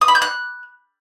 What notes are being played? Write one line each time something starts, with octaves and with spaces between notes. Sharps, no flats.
D#6
B5
G6
F#6